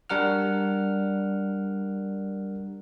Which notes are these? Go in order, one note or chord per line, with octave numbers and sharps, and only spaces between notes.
G3 D4 A#4 F#5 F6